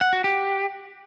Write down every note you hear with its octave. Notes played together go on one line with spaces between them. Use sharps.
F#5
F#4
G4